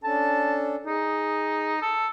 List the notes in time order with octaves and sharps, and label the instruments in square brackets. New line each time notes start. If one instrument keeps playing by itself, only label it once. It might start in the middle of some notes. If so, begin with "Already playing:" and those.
[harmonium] C#4 D4 A4 [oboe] A5
[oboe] D#4 [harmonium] G#4
[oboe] A4